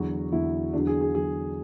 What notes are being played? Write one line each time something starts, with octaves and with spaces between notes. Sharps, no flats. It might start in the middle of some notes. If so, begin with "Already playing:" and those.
Already playing: E2 D3 F#3 F#4
E2 D3 F#3 E4
E2 D3 F#3 D4
G#4
G#4
E2 D3 F#3 G#4